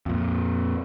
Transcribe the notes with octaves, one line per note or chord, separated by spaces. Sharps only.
F2 A#2